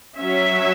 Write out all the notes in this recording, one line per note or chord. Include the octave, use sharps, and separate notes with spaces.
F#3 C#4 E5